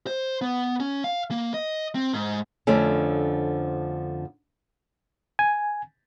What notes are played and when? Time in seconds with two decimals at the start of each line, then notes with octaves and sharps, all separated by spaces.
0.07 C5
0.42 B3
0.80 C#4
1.04 F5
1.31 A#3
1.54 D#5
1.95 C4
2.14 G#2
2.67 F2 D3 F3 A3 C#4
5.39 G#5